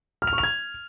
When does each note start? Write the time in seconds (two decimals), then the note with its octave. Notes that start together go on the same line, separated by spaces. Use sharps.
0.22 F6
0.27 F7
0.33 C#6
0.38 F7
0.43 G#6